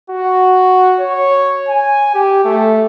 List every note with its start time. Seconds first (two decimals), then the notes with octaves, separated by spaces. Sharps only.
0.10 F#4
1.00 C#5
1.68 G#5
2.14 G4
2.45 A3